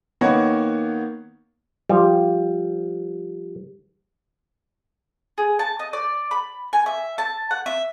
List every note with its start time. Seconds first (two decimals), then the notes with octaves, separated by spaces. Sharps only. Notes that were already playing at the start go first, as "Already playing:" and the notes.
0.21 D#3 A#3 B3 C#5 F#5
1.89 F3 G3
5.38 G#4
5.59 A5
5.79 D#5
5.93 D5
6.31 B5
6.73 G#5
6.86 E5
7.18 A5
7.51 F#5
7.66 E5